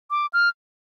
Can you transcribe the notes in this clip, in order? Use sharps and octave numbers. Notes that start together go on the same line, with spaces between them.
D6
F6